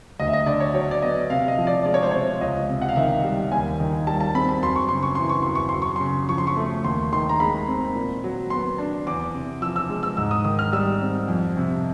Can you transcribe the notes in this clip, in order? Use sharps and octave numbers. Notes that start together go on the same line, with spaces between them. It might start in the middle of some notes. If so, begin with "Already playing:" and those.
D2 D#5
E5
D#5
D3 D5
C#5
F#3 C#5
D5
B3 D#5
C3 F5
D#5
F3
D5
G#3 D5
C#5
C5
C3 C#5
C#2 D#5
C3
F#5
F5
D#3 E5
G3
D#2 G#5
D#3
G3 A5
A5
C4 B5
B5
F#2 C6
C#6
C#3 C6
C#6
E3 C6
C#6
F#2 C6
C#6
F#2 C6
C#6
C#3 C6
F3 C#6
C6
C#6
A3
D#2 C6
D#3 C6
A#5
G#3 B5
C4
A#2
F#3
B3 C6
D4
E2 D6
C3
F3 E6
E6
G#3
E6
G#2 E6
D#6
D#3 D#6
F6
G3 E6
C4
F2
C3